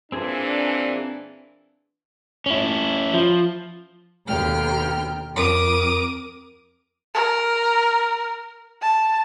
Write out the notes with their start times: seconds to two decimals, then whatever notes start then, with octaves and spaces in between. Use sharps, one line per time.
0.12 A#2 E3 C4 D4 G#4 G#5
2.46 C#4 E4
3.14 F3
4.26 D#2 B2 D3 G5 F6
5.35 F2 A#4 D6 D#6
7.14 A#4
8.82 A5